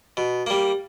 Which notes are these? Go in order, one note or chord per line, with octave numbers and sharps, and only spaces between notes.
B2
G3 A#3